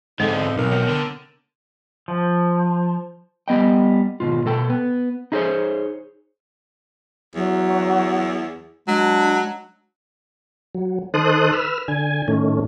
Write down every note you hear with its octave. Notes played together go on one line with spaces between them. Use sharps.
G#2 D3 E3 G#3 B3 C4 D#4 A4
B1 A#4
B3 C#5 G5
D3
F3
G3 B3 D#5 G5
D#2 G#2 B2 F4
B2 A4 G5
B3
D#4 E4 G#4 A4 C5 C#5
E2 F#3
F#3 G#3 D4
F#3
D#3 A4 C5 D#6 F#6
B4 E6 F6
D3 G#5
A2 D#3 A3 C#4